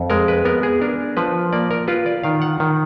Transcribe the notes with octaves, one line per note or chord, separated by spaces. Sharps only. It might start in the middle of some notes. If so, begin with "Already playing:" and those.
Already playing: F2
G#3 A#4
B4
B3 A#4
G#4
D4 A#4
F3 B4
A#3 D5
A#4
F4 B4
D5
D#3 F5
F#5
D#3